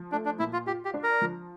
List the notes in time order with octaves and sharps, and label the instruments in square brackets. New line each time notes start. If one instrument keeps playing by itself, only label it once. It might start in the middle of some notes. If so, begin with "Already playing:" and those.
Already playing: [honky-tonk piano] F3
[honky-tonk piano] A3 [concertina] D4
[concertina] D4
[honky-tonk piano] A#2 [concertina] E4
[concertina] F4
[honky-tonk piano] F4 [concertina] G4
[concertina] G4
[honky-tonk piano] D4
[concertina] A#4
[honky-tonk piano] F3